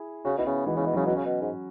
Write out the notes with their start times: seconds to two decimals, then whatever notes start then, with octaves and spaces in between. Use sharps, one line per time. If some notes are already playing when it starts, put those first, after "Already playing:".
Already playing: E4 G#4
0.25 C#3 C#4 F#4
0.38 B2 B3 E4
0.46 C#3
0.66 B2 E3 G#3
0.76 C#3 E3
0.87 B2
0.93 F#3
0.96 C#3
1.06 B2 C#4 F#4
1.16 C#3
1.25 B2
1.41 G#2